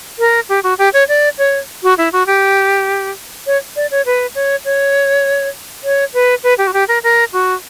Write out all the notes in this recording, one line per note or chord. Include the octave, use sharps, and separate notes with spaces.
A#4
G4
F#4
G4
C#5
D5
C#5
F#4
E4
F#4
G4
C#5
D5
C#5
B4
C#5
C#5
C#5
B4
B4
G4
F#4
G4
A#4
A#4
F#4